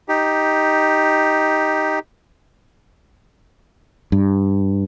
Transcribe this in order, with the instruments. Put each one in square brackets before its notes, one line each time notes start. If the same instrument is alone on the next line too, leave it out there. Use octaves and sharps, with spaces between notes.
[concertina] D#4 G4
[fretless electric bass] G2